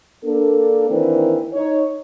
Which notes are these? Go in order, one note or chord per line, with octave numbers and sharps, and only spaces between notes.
A#3 D4 A4
D#3 E3 A#3 C4 D4 A#4
D#4 C#5